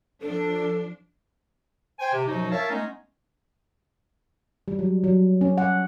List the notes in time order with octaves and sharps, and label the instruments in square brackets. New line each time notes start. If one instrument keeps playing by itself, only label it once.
[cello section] F3 D4 [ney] A4
[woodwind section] C5 G5 G#5
C3
F#2 B2 F3 F#3 D#4
A#4 C#5 E5 F5 A5
G#3 A3 B3 C#4 D#4
[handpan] G3
F#3
F#3
C#4
F#5